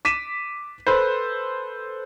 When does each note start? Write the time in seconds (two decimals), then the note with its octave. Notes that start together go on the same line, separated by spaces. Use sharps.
0.05 D6 B6 D#7 E7
0.87 A4 B4 C5